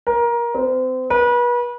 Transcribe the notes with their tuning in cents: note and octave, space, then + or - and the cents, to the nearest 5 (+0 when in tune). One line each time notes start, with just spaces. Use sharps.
A#4 +20
C4 -30
B4 -35